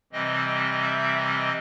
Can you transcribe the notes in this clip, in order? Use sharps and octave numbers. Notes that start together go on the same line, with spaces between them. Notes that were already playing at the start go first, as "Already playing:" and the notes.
C3 E3 G3 C4 D#5
E5
D#5